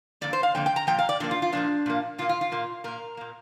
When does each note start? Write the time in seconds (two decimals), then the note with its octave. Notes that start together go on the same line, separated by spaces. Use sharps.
0.21 F2 D3 A#3 D5
0.33 C5
0.43 F5
0.55 F2 D3 A#3 G5
0.66 G5
0.76 A#5
0.87 A#2 F3 G5
0.99 F5
1.09 D5
1.20 A#2 F3 A#3 D4
1.31 F4
1.42 F4
1.52 A#2 F3 A#3 D4
1.86 A#2 F3 A#3
2.18 A#2 F4
2.22 A#3
2.29 F4
2.41 F4
2.52 A#2 A#3
2.84 A#2 A#3 A#4
3.17 A#2 A#3